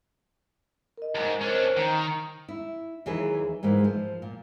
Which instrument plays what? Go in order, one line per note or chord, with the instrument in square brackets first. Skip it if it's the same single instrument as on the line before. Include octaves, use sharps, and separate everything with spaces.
[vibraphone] A#4 D#5
[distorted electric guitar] E2 G#2
[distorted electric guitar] C#4 D4 [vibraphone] A#4 C5 D#5
[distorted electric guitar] D#3 [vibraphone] A#5
[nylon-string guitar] E4
D#2 E3 F#3 G#4 B4
G#2 E3 G#3 A#3
F3
A#2